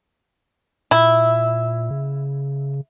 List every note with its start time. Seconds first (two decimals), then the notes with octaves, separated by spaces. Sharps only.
0.91 A#2 E4
1.91 C#3